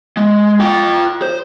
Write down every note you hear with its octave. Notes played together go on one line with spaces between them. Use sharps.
G#3
F4 G5
C5